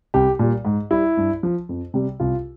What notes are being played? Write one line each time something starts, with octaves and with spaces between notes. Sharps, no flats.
C2 G4
A#2 G3
G#2
G3 E4
G2
F3
F2
C3 G3
C2 F4